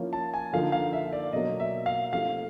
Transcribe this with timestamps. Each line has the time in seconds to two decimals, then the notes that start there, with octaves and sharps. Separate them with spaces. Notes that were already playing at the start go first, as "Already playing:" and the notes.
Already playing: F3 A#3 C#4 E4
0.13 A5
0.34 G#5
0.53 D3 F3 A#3 D#4 F5
0.72 F5
0.93 E5
1.13 D5
1.33 B2 F#3 A#3 D#5
1.60 E5
1.86 F5
2.12 F3 A3 C4 D#4 G4 F5